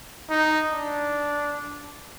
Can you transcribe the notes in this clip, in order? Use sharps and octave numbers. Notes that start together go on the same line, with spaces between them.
D#4
D4